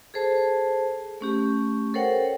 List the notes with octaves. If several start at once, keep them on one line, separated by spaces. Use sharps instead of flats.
G#4 A4 C5 A5
A3 C#4 G4
A4 A#4 C5 C#5 F#5 G5